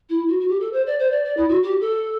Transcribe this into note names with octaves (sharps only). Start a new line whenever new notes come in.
E4
F#4
F#4
G4
A4
C5
D5
C5
D5
D5
E4
F#4
G4
A4